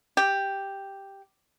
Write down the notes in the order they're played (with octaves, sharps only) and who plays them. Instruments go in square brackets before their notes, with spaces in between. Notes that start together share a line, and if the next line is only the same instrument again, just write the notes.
[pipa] G4